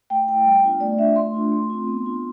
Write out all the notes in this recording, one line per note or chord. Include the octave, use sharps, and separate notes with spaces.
A3 G5
E4 G5
G3
B3 D4 F4
A3 D5
D4 F4 E5
A3 C6
D4 F4
A3
C4 F4
B3
D4 F4